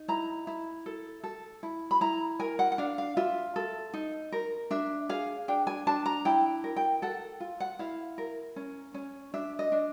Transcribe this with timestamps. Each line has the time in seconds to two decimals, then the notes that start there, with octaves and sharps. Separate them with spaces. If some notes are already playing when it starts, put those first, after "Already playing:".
Already playing: D#4
0.08 E4 A#5
0.47 E4
0.86 A4
1.24 A4
1.63 E4
1.91 B5
2.01 E4 A#5
2.40 A#4 G#5
2.59 F#5
2.72 F#5
2.78 D4 F5
2.98 F5
3.17 F4 E5
3.56 A4
3.94 D#4
4.32 A#4
4.71 D4 E5
5.09 G#4 F5
5.48 D4 G5
5.67 G#5
5.87 D4 A5
6.06 A#5
6.25 E4 G5
6.64 A#4
6.76 G5
7.02 A4 F#5
7.40 F4
7.60 F#5
7.79 E4 F5
8.18 A#4
8.56 C#4
8.94 C#4
9.34 D4 E5
9.59 D#5
9.72 D4